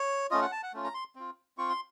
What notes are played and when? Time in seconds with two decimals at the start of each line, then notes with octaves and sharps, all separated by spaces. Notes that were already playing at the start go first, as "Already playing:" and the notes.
Already playing: C#5
0.31 A3 C#4 F4 D#5
0.42 F#5
0.52 A5
0.63 F#5
0.73 A3 C#4 F4
0.84 A#5
0.94 C6
1.16 C4 F4
1.58 C4 F4 C#6
1.69 C6